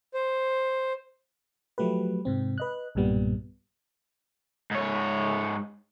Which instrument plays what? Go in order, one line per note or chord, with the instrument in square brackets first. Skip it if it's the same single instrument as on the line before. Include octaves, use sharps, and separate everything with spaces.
[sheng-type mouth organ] C5
[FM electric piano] F3 F#3 A3 G4 B4
G#2 C3 C4
B4 D#5 F#6
B1 G2 A#2 G3 B3
[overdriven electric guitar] G#2 C#5